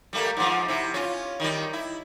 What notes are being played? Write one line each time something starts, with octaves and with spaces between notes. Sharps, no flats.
G3 A3 A#3
G#2 F3
C3 E4
C#4 F4
D#3 G3
E4